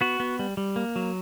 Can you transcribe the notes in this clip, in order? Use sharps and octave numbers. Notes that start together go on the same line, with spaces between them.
B3 F#4
B3
G3
G3
A#3
F#3